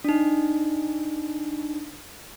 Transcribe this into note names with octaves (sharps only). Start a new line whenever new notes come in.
D4 D#4